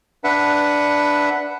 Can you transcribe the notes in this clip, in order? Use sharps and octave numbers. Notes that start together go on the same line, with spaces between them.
D4 B4 E5 F#5